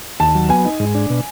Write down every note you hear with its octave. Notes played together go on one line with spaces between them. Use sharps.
D#2 A5
F#3
B3 G#5
D#4
G#2
D4
B2